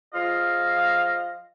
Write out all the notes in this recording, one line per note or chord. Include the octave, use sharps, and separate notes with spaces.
F3 F4 G#4 D#5 F5